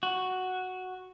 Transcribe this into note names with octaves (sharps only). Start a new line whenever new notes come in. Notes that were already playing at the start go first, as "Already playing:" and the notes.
F#4